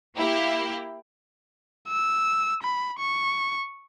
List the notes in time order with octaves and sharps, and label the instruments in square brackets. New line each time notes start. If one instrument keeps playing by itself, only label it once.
[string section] A#3 E4 G4
[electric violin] E6
B5
C#6